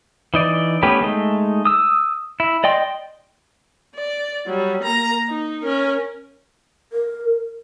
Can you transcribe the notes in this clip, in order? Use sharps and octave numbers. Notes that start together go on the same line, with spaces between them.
E3 D#4 D5
A3 B3 C#4 G4 B4
G#3 A3 D#4
D#6 E6
E4
D5 D#5 G5 C6
D5
F#3 G3
A#3 A#5
D#4
C#4 A#4
A#4